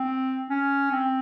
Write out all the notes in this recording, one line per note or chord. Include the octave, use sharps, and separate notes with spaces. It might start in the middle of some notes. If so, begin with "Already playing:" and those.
Already playing: C4
C#4
C4